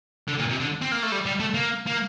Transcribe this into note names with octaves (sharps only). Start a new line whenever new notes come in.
D3
A#2
C3
D3
C4
A#3
A3
G3
G3
A3
A#3
A#3